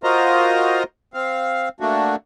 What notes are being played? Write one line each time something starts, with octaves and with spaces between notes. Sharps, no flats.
F4 F#4 A#4 C5 D#5 A#5
C4 F5
A3 A#3 D4 F#4